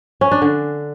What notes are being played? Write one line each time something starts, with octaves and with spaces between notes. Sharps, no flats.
C#4
D4
D3